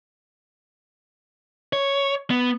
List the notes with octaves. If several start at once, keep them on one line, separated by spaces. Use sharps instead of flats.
C#5
B3